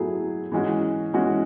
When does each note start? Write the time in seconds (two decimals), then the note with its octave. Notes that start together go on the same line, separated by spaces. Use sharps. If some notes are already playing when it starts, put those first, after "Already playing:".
Already playing: F#3 A3 E4 G#4
0.52 E3 G#3 C#4 F#4
1.13 E3 G#3 C#4 F#4